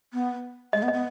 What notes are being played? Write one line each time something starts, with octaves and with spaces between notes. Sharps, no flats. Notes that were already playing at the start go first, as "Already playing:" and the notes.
B3
G#3 D#5
B3
D#5
B3